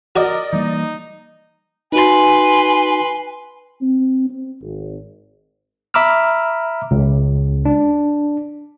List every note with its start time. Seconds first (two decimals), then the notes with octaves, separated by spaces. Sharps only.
0.16 F#4 A#4 D5 D#5
0.53 E3 G3 A#3 D#4
1.92 D#4 F#4 B4 G#5 C6
3.81 C4
4.29 C4
4.62 G#1
5.94 E5 A#5 B5 D6 E6 F6
6.91 C#2
7.65 D4